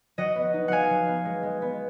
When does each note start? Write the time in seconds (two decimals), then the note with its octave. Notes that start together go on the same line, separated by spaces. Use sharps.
0.18 F#3 D#5 F#5
0.36 B3
0.54 D#4
0.68 F#3 F5 F#5 G#5
0.91 F#3
1.08 B3
1.25 G#3
1.43 G#3
1.62 B3